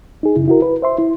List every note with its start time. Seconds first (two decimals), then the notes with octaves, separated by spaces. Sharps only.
0.23 D#4 G#4
0.36 F#2 C#3 E4
0.48 E4 F#4 A#4
0.62 B4
0.82 C5 E5 C6
0.98 E4